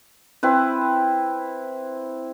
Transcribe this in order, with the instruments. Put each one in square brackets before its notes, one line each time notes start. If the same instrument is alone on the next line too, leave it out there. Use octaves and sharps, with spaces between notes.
[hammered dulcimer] C4 E4 B4